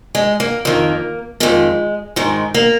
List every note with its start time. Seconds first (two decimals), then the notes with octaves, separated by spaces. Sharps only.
0.15 G#3
0.40 A#3
0.65 F2 D#3 A#3
1.40 F2 D#3 G#3
2.16 G#2 D#3 G#3
2.54 A#3